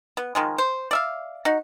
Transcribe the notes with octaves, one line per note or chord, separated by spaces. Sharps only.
B3
D#3 F3 G#3
C5
D5 E5 F5
D#4 F#4